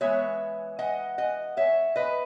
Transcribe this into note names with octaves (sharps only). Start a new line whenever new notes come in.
E3 G#3 B3 C#5 E5
D#5 F#5
D#5 F#5
C#5 E5
B4 D#5